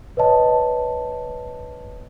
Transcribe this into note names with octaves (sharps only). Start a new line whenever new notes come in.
B4 C#5 D#5 A5